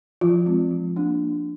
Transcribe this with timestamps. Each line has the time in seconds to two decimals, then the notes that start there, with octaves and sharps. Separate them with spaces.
0.21 F3 F4
0.46 G#3 C4
0.71 F3
0.96 A#3 D4